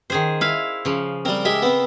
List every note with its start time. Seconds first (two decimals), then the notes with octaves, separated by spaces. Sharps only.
0.10 D#3 G#4 C5
0.41 E4 F5
0.85 C#3 F3
1.25 G3 C4 A#4
1.45 G#3 G4 E5
1.62 B3 C4